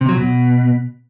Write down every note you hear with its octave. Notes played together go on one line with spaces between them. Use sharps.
C3
F#3
B2